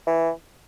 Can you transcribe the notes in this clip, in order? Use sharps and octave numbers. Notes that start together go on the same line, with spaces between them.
E3